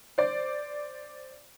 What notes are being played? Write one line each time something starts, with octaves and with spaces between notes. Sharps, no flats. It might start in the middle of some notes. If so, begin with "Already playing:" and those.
C5 D5